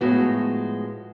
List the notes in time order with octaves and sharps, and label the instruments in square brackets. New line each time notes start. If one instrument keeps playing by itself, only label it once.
[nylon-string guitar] A2 F3 G#3 B3 E4 F#4